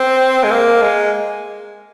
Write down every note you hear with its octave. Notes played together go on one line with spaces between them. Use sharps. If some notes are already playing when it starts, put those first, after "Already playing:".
Already playing: C4
G#3
A#3
G#3